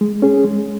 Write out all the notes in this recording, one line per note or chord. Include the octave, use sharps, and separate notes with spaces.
G#3
C#4 G#4
G#3